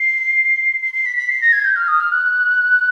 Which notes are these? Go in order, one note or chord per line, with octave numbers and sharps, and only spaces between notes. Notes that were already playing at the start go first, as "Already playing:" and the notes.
Already playing: C7
C7
C7
B6
B6
C7
A#6
G#6
G6
F6
D#6
F6
F#6